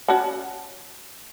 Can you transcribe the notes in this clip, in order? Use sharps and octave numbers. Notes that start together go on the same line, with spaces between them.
C#4 F#4 A5